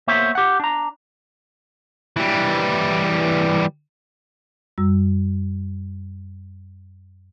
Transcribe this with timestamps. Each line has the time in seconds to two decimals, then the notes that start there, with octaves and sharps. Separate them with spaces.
0.08 A#3 B3 C5 C#5 E5
0.35 G4 F#5
0.60 D4 A#5
2.17 E3 G3
4.78 F#2 G3 E6